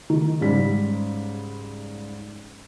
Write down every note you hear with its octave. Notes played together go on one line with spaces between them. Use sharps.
D#3
G#2 C#3 G3 B6